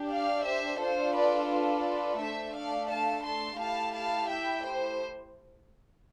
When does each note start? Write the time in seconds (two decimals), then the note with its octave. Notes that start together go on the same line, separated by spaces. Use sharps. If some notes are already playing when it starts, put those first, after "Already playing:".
Already playing: D4 G4
0.10 D5 F5
0.46 C5 E5
0.80 D4 F4 A4 C5
1.15 B4 D5
1.51 B4 D5
2.20 A3 D4 A4 C5 E5
2.55 D5 F5
2.90 F5 A5
3.25 A5 C6
3.61 A3 E4 G4 F5 A5
3.95 F5 A5
4.30 E5 G5
4.65 C5